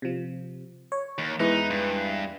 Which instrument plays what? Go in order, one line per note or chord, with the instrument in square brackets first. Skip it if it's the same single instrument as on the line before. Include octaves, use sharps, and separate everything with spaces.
[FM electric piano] C3 F3
C#5
[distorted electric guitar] D#2
[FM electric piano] E2 E3 E5 [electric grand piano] G#3 B4 [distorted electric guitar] D#4
[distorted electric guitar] G2